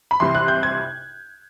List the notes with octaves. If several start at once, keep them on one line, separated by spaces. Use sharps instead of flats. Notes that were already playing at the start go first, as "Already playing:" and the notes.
B5
C2 C3 E3 C6
F#6
G6
G#6